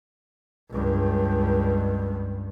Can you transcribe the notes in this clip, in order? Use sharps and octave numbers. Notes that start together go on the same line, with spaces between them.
C#2 G2